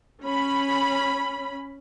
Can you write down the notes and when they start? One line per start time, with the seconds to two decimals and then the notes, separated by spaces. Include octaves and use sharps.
0.23 C#4 B5